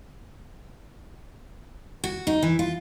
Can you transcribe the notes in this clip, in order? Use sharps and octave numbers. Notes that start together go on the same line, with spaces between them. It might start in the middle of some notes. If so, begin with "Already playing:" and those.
F#4
D#4
E3
F4